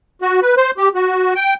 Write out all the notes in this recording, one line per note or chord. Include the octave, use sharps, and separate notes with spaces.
F#4
B4
C5
G4
F#4
G5